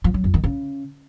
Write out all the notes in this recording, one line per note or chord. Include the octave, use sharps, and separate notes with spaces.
F3
F#3
F2
D#3
C#3